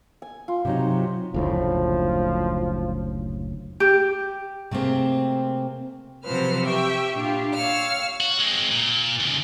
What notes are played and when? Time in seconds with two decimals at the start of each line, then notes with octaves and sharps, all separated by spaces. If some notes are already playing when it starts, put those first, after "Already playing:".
0.22 G#5
0.48 F4
0.65 C3 F#3 D#4
1.34 F#1 D2 A2 F3
3.80 G4
4.71 C3 A3 A#3 C4 G#4
6.23 C3 F3 F#3 B4 C5 F6
6.64 G4 E5 G5 C#6
7.14 A#2 A#3 D4 F4 G4
7.55 C#5 F5 E6 F6
8.20 F#4
8.39 G#3 C4
8.71 A#2
9.20 D#2 C#3